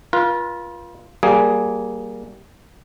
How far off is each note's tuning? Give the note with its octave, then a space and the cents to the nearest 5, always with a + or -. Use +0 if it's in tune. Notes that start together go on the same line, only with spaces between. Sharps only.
F4 +0 B4 -45
G3 -20 A#3 +0 G#4 +0